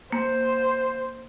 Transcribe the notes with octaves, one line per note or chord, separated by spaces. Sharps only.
A#3 C5